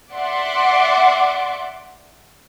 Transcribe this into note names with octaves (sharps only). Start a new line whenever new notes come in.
D5 E5 F#5 C6 D6